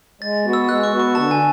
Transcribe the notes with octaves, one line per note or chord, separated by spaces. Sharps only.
G#3 A6
B3 F#4
E6
G#3 F#6
C#6
B3 F#4
C#6
D3 A5
G#5